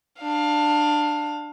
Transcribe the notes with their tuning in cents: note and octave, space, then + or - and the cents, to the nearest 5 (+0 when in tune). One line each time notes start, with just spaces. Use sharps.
D4 +15 F5 +20